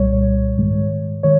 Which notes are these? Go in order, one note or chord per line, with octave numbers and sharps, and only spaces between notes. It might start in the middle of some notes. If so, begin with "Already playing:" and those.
Already playing: C2 A#2 G3 C#5
G#2 D#3 G#3
D#3 G#3 C#5